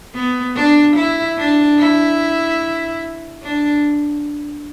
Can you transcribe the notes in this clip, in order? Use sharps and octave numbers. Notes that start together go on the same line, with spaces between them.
B3
D4
E4
D4
E4
D4